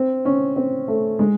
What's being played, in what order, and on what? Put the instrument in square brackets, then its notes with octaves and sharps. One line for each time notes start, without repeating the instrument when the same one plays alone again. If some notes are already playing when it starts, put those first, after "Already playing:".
Already playing: [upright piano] C4
C#4
C4
A3
G#3